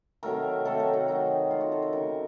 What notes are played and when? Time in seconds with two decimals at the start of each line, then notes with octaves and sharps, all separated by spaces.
0.23 C3 D#3 F#3 A3 A#4
0.65 C3 D#3 F#3 A3 A4
0.80 A#4
0.93 F#4
1.07 C3 D#3 F#3 A3 D#4
1.50 C3 D#3 F#3 A3 F4
1.61 F#4
1.72 A4
1.82 A#4
1.93 C#3 A3 A#4